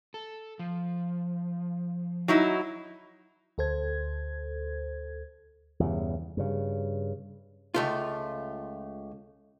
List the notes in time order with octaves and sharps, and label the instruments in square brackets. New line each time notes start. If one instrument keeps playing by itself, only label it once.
[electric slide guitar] A4
F3
[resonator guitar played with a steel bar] F#3 D#4 E4
[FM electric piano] D2 A4 C5 G#6
[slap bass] E2 G2 C#3
G2 C#3
[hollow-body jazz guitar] C#2 A3 F4